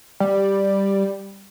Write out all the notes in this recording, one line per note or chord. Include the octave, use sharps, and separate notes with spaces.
G3